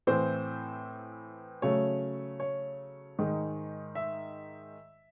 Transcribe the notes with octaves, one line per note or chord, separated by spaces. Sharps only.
A2 E3 C4 C5
C#3 F#3 A3 C#4 C#5
C#5
G#2 D#3 G#3
E5